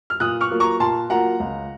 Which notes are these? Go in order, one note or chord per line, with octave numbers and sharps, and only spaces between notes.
F6
A#2 D#6 F#6
C#6 F6
F#3 A#3 F4
A#5 C#6
A#2 A5 C6
F#3 A#3 F4 F#5 A#5
C#2